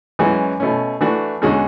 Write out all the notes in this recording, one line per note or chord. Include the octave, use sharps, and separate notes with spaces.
F#2 E3 G#3 C#4 F#4
B2 A3 C#4
E3 A3 D4 F#4
E2 D3 G#3 C#4 F#4